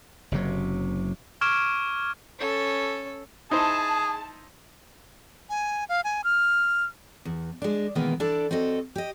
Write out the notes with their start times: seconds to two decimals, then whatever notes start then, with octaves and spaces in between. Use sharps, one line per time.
0.32 F#1 C3 F#3
1.41 C#6 D6 F6 G#6 D7 E7
2.39 C#4 A4
3.51 D#4 E4 G#4 C5 A5
5.50 G#5
5.89 F5
6.04 G#5
6.24 F6
7.25 E2
7.62 G#3 D4
7.95 B2 D#3 E3 G#3 A#3 B3
8.20 D4 E4 A4 D5
8.51 C4 F#4 A4 D#5
8.96 G4 D#5